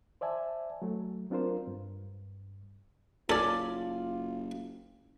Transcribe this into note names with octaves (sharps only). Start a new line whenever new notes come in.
C5 D5 E5 G#5 A5
F#3 A3
F#3 C4 D4 F4 A#4 C5
G2
F#1 C#4 F4 A4 D5